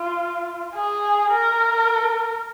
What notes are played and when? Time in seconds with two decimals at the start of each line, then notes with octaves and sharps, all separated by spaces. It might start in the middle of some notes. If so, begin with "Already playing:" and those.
Already playing: F4
0.74 G#4
1.31 A#4